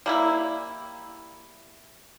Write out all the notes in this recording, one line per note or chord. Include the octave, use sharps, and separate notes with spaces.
G3 A#3 E4